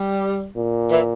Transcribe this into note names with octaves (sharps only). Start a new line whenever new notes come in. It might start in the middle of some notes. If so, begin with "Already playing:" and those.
Already playing: G3
A#2
E3